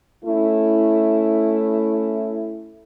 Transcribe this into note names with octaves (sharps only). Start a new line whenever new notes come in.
A3 C#4 E4